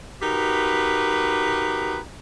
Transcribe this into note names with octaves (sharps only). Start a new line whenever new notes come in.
D#4 F#4 G4 A#4 B4